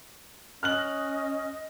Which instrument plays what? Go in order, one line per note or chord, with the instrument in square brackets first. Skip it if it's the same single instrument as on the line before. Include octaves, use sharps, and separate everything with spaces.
[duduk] C#4 [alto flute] D#5 [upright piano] F6 F#6 F#7